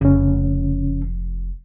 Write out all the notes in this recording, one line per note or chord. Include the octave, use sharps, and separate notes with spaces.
F1 C#3 F3 C#4